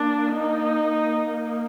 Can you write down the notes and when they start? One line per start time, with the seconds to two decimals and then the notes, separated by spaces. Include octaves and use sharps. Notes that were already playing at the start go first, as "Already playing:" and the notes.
Already playing: A#3 D4
0.33 D#4